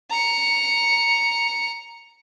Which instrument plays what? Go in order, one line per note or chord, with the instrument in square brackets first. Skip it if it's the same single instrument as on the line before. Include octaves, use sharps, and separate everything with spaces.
[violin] A#5 C#7